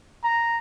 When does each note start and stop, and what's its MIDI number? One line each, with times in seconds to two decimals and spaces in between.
0.24 0.58 82